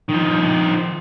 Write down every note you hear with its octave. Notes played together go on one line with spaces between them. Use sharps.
D#3 F3